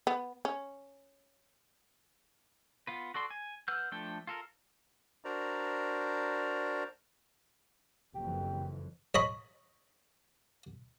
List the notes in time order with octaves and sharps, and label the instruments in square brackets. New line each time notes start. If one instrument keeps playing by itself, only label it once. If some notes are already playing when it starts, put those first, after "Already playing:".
[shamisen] B3
C#4
[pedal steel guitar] B3 F4 B4
F#4 A4 D5 C6
G#5
B4 F#5 E6 F6 G6
F3 A3 D4 A4 G5
F4 A4 A#4
[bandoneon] D4 F#4 A#4 C5 D5 A#5
[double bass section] F#1 F2 E3 [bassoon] G4
[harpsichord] C#5 D#5 B5